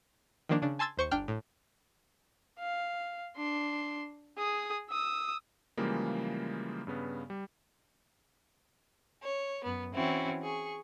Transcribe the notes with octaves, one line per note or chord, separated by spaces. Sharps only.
D#3 F3 A#3 D4
C#3 D4
G#5 A5 C6 E6 G#6 A6
D#2 C5 C#6 C#7
G1 D4 G5 F6
A2
F5
D4 C6
G#4 D#6
D#6 E6
C#3 E3 F3 G3 G#3 A#3
G2 C#3 B3
G3
C#5
F#2 B3
E3 C4 C#4 E4 F#4
G#4 C#6